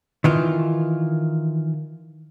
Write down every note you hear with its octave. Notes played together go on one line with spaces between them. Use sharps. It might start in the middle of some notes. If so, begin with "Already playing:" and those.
D#3 E3 F4